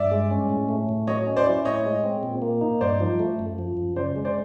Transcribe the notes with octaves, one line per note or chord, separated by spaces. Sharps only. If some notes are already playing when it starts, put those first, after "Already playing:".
Already playing: G2 D5 E5
G#3
C#4
A2
A3
A2
F#3 C#5 D#5
C#4
C5 D5
E4
A2 C#5 D#5
G#3
C4
A#2
A#3
D#4
G2 C5 D5
F3
A3
F#2
F3
F#2
C#3 C5 D5
G#3
C5 D5